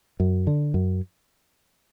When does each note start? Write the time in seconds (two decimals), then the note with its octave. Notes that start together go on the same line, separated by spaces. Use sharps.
0.20 F#2
0.47 D3
0.74 F#2